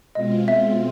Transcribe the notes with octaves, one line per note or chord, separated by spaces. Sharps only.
B2 G#3 C4 F4 D#5
E5